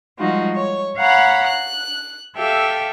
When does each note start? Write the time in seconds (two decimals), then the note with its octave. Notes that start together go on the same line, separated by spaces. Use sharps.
0.19 F3 G3 G#3 D#4 F4 F#4
0.56 C#5
0.97 C#5 F5 F#5 A#5 B5
1.47 F#6
2.37 G4 A4 E5 F5 G5